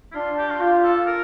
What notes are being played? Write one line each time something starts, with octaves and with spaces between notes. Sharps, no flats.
E4
D4 F4
G4
F4
F4 G4
A4
A#4